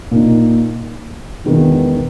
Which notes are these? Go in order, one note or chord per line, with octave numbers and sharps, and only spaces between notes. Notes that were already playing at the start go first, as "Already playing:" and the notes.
A#2 A#3 D#4
E1 E2 D#3 G#3 B3